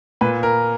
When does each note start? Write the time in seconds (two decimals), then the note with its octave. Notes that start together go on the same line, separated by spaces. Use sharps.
0.21 A#2 B4
0.43 A#4